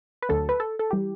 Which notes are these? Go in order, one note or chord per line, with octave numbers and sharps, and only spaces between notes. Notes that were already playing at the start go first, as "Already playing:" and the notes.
B4
D2 D3 F#3 A4
B4
A4
A4
E3 G3 G4